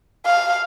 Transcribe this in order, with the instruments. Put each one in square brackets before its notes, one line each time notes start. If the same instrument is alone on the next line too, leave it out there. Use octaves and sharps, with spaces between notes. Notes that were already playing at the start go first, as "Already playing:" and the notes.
[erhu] F5